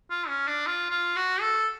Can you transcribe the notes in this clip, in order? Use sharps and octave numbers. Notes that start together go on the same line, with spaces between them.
F4
C#4
D4
F4
F4
F#4
A4